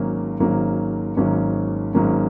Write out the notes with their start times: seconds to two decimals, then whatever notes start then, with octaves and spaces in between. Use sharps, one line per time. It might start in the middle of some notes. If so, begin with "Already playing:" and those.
Already playing: G#1 G#2 F#3 A#3 C#4
0.40 G#1 G#2 F#3 A#3 C#4
1.17 G#1 G#2 F#3 A#3 C#4
1.94 G#1 G#2 F#3 A#3 C#4